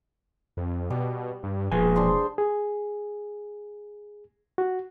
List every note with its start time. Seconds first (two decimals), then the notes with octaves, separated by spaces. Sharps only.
0.57 F2
0.90 B2 G3
1.43 G2
1.72 E1 A#2 F3 G#4 B4 G#5
1.96 D4 C5 C6
2.38 G#4
4.58 F#4